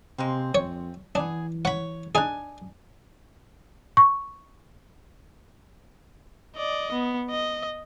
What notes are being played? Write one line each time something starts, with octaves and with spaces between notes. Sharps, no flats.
C3 G#3 A#3 C4
F2 C#5
E3 B3 D4 G#4
C#5 F#5 B5
D4 D#4 G#4 G#5
C#6
D5 D#5
B3
D#5